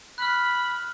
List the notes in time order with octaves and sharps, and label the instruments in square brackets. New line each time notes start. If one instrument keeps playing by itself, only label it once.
[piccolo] B5 [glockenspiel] F6 F#6